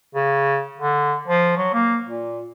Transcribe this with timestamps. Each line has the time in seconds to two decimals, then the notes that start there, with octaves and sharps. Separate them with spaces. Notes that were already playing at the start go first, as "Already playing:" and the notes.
0.15 C#3
0.78 D3
1.28 F3
1.57 F#3
1.74 A#3
2.06 A#2